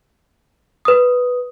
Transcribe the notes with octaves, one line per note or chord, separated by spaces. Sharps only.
B4 D#6